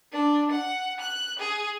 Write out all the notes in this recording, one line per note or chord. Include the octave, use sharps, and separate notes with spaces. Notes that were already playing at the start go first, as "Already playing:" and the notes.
D4
F#5
F#6
G#4